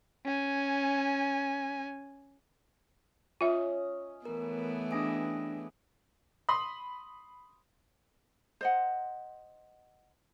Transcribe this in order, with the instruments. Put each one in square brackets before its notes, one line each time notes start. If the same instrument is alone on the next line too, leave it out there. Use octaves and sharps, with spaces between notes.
[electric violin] C#4 G#5
[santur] C#4 D#5 [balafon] F4 E5
[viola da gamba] E3 A3 B3 [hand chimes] A#4
[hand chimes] D4 A#6 D7 [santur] G4 G#4 D#5
[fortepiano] B5 C6 D#6
[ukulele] C5 D#5 F#5